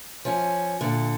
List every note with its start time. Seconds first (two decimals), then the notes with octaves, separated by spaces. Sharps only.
0.25 F3 C#4
0.81 A#2 D3